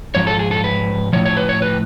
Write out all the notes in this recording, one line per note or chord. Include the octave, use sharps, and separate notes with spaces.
G#2 F3 C#5
A4
G#4
A4
B4
A2 F3 C#5
C#5
B4
C#5
B4